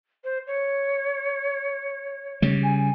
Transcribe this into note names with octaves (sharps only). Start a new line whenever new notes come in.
C5
C#5
C#3 G3
G#5